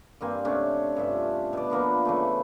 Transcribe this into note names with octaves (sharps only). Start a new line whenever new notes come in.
G2 A#3 C4 G#5
C3 A3 C#4 D4
G2 F4 E5
B2 D5
F3 A#3 B3 D4
C#3 E3 A3